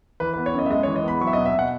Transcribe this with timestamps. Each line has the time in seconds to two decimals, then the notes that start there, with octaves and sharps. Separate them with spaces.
0.20 E3 B4
0.33 B4
0.37 B3
0.46 C#5
0.54 F#2 D#5
0.66 E5
0.70 G#3 D#5
0.83 C#5
0.87 E3
0.96 D#5
1.04 B3 B5
1.21 F#3 C#6
1.27 E5
1.33 D#5
1.38 B2
1.45 E5
1.54 B2 F#5